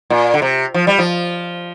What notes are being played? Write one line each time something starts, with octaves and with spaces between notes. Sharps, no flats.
A#2
D3
C3
F3
G3
F3